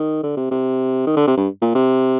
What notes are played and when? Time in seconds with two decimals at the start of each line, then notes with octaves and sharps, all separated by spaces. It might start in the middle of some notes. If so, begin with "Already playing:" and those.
Already playing: D#3
0.24 D3
0.37 C3
0.51 C3
1.07 D#3
1.17 D3
1.27 C3
1.37 G2
1.62 A#2
1.75 C3